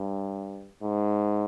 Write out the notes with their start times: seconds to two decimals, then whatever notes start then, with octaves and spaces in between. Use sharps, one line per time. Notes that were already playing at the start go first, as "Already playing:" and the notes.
Already playing: G2
0.83 G#2